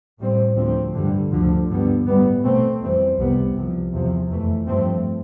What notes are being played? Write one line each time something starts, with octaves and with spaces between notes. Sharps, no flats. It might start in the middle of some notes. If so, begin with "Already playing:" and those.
A2 G3 C4
D2 D3 F3 C4
G2 D3 G3
D2 D3 F3
G2 D3 G3 B3
A2 G3 B3
B2 A3 C4
F2 E3 G3 C4
C2 C3 G3 B3
C2 C3 F3
E2 C3 F3
F2 E3 A3
G2 F3 A3 C4